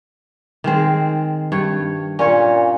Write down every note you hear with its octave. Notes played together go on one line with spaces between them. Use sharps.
D#3 G#3 C4
G2 C#5
A#2 C#4 C#5